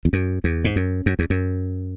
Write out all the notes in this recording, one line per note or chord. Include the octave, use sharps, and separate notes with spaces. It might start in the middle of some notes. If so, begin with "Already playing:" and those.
E2
F#2
E2
G#2
F#2
F#2
E2
F#2